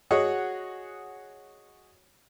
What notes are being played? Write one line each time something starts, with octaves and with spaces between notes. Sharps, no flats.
F#4 G#4 C#5 D#5 F#5